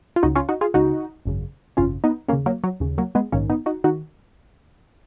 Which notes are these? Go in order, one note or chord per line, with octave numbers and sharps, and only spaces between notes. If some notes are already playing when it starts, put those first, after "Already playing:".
F4
C#2 C#3 D#4 F#4
C#4 F4
D#4 F#4
F4 G#4
C#2 C#3 D#4 F#4
G#1 F#2 C#3
G#1 F#2 C#3 C#4 F4
B3 D#4
D#2 C#3 A#3 C#4
F#3 A#3
F#3
D#2 C#3
F#3 A#3
G#3 B3
A#1 G#2 D#3 A#3 C#4
B3 D#4
D#4 F#4
D#3 D#4 F#4